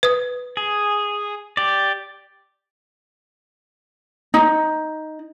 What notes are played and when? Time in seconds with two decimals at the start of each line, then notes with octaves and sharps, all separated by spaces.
0.03 B4 D#6
0.57 G#4
1.57 G4 D5
4.34 D#4